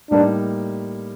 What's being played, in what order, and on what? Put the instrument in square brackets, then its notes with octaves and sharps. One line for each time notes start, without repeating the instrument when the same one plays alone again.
[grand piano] A2 G3 A#3 D#4 [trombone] D4